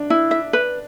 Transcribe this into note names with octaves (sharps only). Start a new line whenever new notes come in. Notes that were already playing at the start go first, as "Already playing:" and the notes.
Already playing: D4
E4
E5
B4